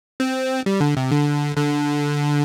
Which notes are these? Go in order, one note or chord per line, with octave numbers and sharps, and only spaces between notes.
C4
G3
D3
C3
D3
D3